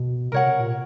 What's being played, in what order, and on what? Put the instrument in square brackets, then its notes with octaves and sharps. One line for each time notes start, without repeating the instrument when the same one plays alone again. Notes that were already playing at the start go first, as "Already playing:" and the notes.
Already playing: [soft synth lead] B2
[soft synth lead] C3 [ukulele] A#4 C#5 F#5
[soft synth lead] C3
A#2